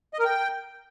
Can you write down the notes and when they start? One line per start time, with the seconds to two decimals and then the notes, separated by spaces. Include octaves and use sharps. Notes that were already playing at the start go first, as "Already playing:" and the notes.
0.14 D#5
0.19 A#4
0.25 G5